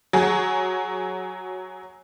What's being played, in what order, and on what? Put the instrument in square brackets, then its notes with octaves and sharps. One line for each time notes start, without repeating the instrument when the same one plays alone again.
[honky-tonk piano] F#3 G#4